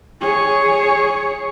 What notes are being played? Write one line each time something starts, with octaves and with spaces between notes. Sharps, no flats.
G#4 C#5